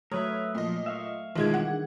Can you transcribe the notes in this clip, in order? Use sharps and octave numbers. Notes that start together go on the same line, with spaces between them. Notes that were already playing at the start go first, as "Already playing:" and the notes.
F#3 A3 A#4 B4 C#5 E5 D#6
A#2 F3 D#5
E5 F5 C#6
B1 D#3 E3 G#3 D#4 F4 G#4 G#6
G3 D4 F#5
G#4